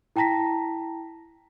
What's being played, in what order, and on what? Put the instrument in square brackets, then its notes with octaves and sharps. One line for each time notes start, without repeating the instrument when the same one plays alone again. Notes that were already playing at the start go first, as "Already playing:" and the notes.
[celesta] E4 G5 A5 A#5 A#6 B6